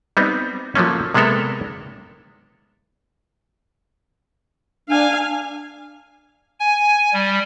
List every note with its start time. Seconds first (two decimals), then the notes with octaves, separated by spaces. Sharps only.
0.17 G3 B3 C4 D#4
0.75 F3 F#3 A3 A#3 C#4
1.14 C3 G#3 A#3 B3 A4 A#4
4.89 D4 F5 G#5
6.60 G#5
7.13 G3